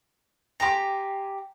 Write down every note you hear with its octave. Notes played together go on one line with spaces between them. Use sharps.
G4 G5 G#5 A#5 C6